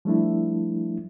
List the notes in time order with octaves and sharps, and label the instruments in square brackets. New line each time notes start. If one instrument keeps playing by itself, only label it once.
[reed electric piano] F3 G3 A3 D4 E4